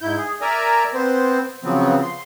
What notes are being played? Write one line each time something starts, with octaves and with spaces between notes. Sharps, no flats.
G#2 E4 G6
G#4
A#4 D5 E5 G#5 A#5
B3 C4 C5
C#3 F3 F#3 B3 C4
C6